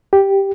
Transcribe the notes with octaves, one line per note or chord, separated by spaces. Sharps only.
G4